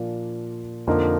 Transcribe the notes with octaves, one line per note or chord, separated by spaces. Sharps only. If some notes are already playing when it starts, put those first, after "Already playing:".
Already playing: A#2 F3 A#3 D4 F4
F2 D3 F3 A#3 D#4